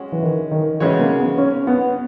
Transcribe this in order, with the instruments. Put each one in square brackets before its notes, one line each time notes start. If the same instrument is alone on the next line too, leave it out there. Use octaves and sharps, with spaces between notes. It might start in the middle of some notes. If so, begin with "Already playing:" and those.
Already playing: [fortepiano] G#3 C#4 F#4
[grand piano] E3
D#3
D#3
[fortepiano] C#3 G#3 C#4 F#4 C#5 [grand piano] E3
[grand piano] A#3
B3
C#4
B3